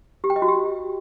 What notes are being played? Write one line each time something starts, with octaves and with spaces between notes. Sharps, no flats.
G4
G5
D#5
F#4
G4